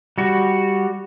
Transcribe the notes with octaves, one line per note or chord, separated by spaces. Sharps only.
G3 F#4